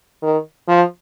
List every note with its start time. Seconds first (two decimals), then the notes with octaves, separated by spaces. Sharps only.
0.23 D#3
0.68 F3